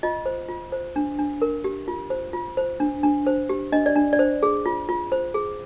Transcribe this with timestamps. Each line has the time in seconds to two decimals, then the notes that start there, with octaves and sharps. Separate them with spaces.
0.03 F4 D#5
0.26 C5
0.49 F4
0.72 C5
0.96 D4
1.19 D4
1.42 A#4
1.64 G4
1.88 F4
2.10 C5
2.33 F4
2.57 C5
2.80 D4
3.03 D4
3.27 C5
3.49 G4
3.73 D4 D#5
3.86 D5
3.96 D4
4.13 D5
4.19 C5
4.43 G#4
4.66 F4
4.89 F4
5.12 C5
5.34 G#4